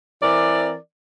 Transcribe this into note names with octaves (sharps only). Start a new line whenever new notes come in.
E3 C4 A#4 D5